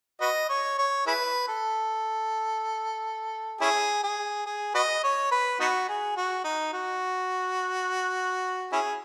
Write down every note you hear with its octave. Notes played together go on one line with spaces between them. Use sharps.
F#4 B4 D#5
C#5
C#5
E4 G#4 B4
A4
C#4 E4 G#4
G#4
G#4
F#4 B4 D#5
C#5
B4
B3 D#4 F#4
G#4
F#4
D#4
F#4
C#4 E4 G#4